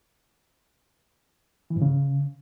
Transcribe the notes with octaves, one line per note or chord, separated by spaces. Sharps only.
E3
G#2
C#3